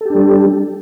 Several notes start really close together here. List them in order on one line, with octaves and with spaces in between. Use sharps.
A4 G4 D4 G3